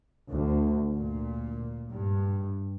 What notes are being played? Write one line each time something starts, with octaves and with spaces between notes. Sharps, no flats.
D2
A#2
G2